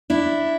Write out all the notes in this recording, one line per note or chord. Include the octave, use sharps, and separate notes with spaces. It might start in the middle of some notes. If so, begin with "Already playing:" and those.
D4 E4